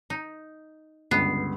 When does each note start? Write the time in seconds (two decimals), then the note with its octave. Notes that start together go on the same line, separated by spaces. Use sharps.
0.10 D#4
1.11 C#2 G2 D3 B3 C7